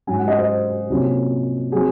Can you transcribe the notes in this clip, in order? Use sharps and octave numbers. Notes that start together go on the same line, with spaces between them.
G#2 F#3 C#4 G#5
F#5
D#5
C5
C2 A#2 F#3 C#4
F#3 C4 G#4